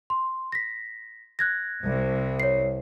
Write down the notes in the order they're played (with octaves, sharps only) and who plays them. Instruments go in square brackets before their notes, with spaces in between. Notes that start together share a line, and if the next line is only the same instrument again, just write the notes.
[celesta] C6
A#6 B6
F#6 G#6 A#6
[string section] C2
[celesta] C#5 C7